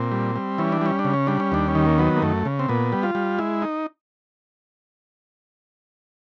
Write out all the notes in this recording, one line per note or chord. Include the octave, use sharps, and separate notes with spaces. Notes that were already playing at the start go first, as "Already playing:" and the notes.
Already playing: A#2 C4
G3
G3
E3 C#4
D4
G3 C#4
D4
C#3
C#4
G3 D4
C#4
D#2 D4
C#4
D#3
A#3
F#3 B3
A#3
F#2 A3
C#3
C4
A#2 B3
G3
F4
G3
G#3 E4
D#4